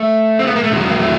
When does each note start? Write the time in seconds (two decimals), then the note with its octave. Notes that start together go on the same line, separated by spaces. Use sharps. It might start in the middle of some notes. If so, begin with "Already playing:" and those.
Already playing: A3
0.39 C4
0.47 B3
0.56 A#3
0.64 A3
0.71 E2 C3 D#3 F#3 G#3
0.89 A#3
0.99 A3